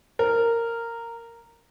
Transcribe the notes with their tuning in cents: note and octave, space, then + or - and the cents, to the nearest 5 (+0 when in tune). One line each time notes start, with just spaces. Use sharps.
A#4 -10